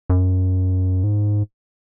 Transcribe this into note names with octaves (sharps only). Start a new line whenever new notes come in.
F#2
G#2